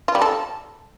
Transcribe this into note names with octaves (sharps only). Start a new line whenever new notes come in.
F4
G3
A4